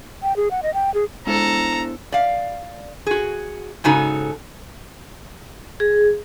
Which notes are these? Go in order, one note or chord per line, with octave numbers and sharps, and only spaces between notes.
G5
G#4
F#5
D#5
G5
G#4
G#3 B3 D4 E4 A4 C5 A#5
D5 F5
F#4 G#4
G#2 C#3 D#4 F#4 A4
G#4